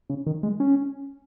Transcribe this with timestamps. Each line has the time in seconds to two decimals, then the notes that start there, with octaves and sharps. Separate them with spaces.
0.09 C#3
0.26 D#3
0.43 G#3
0.60 C#4